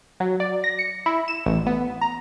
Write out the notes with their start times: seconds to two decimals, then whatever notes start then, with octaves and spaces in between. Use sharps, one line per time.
0.20 F#3
0.40 D5
0.64 A#6
0.79 C#7
1.06 E4
1.28 E7
1.46 A1
1.66 B3
2.01 A#5